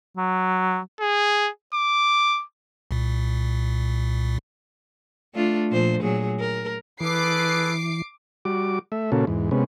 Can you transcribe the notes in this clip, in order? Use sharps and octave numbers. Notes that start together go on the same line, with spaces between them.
F#3
G#4
D6
C2 A#2
A3 D4 F4
A#2 F3 C5
A#2 F#3 G#4
A#4
E3 G#4 A4 B4 D6 C7
G3 F#4 D6
A3 E5
A#2 C#3 A#3 C#4 F#4 A4
E2 G#2
C3 G#3 B3 C#4